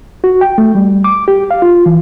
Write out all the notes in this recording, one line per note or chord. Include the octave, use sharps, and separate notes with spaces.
F#4
G5
A3
G3
D6
G4
F5
F4
E3